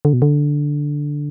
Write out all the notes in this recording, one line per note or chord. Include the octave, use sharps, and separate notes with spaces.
D3
B2
D3